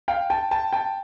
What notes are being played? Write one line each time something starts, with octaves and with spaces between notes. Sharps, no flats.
F5 G5
G5 A5
G5 A5
G5 A5